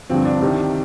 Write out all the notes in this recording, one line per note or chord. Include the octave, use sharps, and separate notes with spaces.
G2 D3 F3 C4
D4
C2 C3 D#3